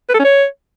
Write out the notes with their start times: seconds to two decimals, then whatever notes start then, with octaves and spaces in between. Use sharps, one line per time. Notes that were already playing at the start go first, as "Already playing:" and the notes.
0.09 B4
0.14 A4
0.19 C#4
0.25 C#5